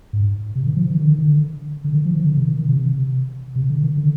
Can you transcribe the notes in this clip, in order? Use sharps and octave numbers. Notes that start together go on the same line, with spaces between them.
G#2
C3
D#3
F3
D#3
D3
D#3
D3
D3
D#3
F3
D#3
D3
C3
D#3
D#3
C3
C3
D3
D#3
D3